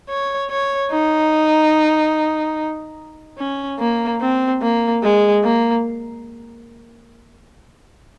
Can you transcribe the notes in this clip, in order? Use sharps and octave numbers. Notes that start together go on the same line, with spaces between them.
C#5
C#5
D#4
C#4
A#3
C4
A#3
G#3
A#3